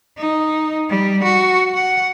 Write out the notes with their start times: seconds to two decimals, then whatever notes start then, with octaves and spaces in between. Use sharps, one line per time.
0.18 D#4
0.90 G3
1.23 F#4
1.74 F#5